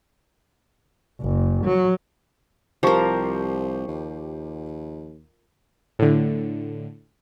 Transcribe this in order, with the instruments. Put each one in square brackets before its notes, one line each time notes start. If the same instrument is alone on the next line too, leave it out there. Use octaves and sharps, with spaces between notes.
[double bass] F#1
F#3
[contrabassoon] C2 [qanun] F3 A#4 [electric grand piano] G4 C5 C#6
[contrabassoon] D#2
[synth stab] A2 D3